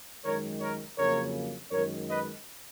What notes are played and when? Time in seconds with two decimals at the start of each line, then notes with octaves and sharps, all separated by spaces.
0.24 F#2 D#3 G#3 A#4 C#5
0.61 A#4 C#5
0.98 F2 C#3 F#3 A#3 A#4 C#5
1.72 F#2 D#3 G#3 A#4 C#5
2.09 B4 D#5